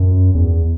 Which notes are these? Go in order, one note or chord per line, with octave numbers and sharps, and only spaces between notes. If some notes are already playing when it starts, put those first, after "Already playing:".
Already playing: F#2
E2